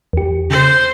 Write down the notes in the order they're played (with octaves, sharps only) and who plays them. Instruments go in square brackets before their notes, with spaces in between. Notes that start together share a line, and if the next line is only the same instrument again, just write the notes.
[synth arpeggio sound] E2 G4
[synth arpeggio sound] C#3 [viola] C5